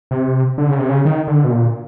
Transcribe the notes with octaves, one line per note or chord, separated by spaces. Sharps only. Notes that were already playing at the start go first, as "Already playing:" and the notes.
C3
D3
C#3
C3
C#3
D#3
D3
B2
A#2